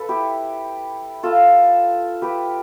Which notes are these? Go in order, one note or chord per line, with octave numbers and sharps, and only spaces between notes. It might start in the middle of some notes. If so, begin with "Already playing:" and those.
Already playing: A4 B4
E4 G4
F4 A4
G4 B4